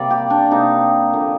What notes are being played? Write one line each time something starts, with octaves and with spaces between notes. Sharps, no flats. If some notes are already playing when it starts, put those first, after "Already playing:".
Already playing: C3 G3 A#3 D5
G4
D4
C3 G3 A#3 D#4
D3 F3 A#3